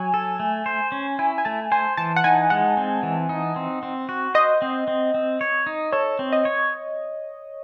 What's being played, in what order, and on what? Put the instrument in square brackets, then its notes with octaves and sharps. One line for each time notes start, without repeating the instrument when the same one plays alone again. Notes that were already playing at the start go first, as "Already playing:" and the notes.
Already playing: [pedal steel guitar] F#3 [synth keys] G#5
[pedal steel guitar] A4
A3
C5
C#4
[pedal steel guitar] E4 [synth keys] G#5
[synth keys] G#5
[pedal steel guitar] A3 [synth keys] A5
[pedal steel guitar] C5 [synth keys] G#5
[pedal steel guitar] E3 [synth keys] A5
[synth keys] F#5
[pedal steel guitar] D#4 [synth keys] G#5
[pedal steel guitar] G#3 [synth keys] F#5
[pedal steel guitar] C4
E3
D#4
C4
C4
F#4
[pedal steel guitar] C5 [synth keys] D#5
[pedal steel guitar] C4
C4
C4
C#5
D#4
[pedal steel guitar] A4 [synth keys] C#5
[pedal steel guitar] C4
[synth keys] D#5
[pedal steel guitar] C#5